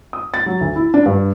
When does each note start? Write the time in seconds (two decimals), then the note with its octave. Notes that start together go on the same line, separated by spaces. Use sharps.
0.13 D#6
0.34 A6
0.46 F#3
0.61 D2
0.76 E4
0.94 D4
1.06 G2